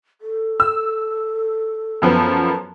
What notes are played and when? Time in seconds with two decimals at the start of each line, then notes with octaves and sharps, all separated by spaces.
0.21 A4
0.60 E6
2.02 F#2 F3 B3